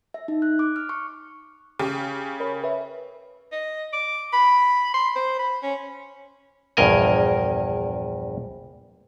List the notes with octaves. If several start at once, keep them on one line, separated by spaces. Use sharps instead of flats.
E5
D#4
F#6
D6
F6
C#6
C#3 G4
A#4 C#5 B5
B4 C#5 E5
D#5
D6
B5
C6
C5
B5
C#4
A#1 E2 G2 A#4 D#5 G#5